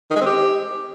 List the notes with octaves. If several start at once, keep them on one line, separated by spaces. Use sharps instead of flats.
D#3
G#3
C4
G4